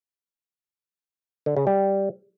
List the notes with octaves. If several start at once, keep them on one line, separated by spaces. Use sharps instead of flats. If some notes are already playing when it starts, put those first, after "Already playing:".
D3
C#3
G3